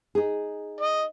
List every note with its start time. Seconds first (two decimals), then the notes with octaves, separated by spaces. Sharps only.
0.15 D#4 G#4
0.81 D#5